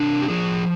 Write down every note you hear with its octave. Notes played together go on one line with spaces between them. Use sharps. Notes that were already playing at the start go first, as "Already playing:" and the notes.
Already playing: C3 D4
G4
F3 G#4